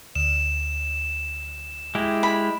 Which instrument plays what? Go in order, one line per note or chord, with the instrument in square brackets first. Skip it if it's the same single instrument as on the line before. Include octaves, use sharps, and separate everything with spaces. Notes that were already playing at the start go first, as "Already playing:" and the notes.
[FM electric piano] D2 [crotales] E7
[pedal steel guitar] G#3 E4 G4
[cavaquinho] B5